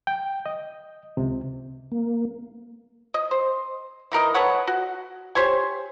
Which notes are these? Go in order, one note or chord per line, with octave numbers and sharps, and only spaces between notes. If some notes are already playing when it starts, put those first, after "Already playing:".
G5
D#5
C#2 C3
A#3
D#5
C5
E3 D#4 A#4 D#5
A4 B4 C#5 F#5
F#4
G4 C5 C#5 G#5